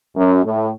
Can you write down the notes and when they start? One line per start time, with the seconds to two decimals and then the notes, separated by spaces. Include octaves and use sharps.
0.16 F#2
0.44 A2